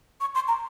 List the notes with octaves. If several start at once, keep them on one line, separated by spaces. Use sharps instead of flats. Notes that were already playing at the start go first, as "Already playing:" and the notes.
C#6
C6
A#5